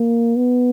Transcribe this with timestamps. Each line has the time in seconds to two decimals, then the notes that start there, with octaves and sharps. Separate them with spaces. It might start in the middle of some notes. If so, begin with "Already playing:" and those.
Already playing: A#3
0.36 B3